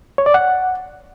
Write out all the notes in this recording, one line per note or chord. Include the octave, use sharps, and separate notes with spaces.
C#5
D5
F#5